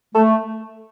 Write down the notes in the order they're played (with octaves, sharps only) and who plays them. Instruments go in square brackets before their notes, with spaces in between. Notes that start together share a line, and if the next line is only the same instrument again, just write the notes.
[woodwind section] A3 [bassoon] A4